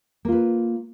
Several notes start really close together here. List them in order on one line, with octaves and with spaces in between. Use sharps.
A#3 F4 B4